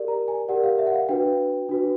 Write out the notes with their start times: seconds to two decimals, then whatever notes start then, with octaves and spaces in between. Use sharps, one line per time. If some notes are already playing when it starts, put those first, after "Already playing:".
Already playing: G4 A#4 D5
0.08 A#5
0.28 G#5
0.48 G4 A#4 D5 F#5
0.64 F5
0.79 E5
0.87 F#5
0.94 F5
1.09 D4 F#4 B4 G5
1.69 D4 F#4 B4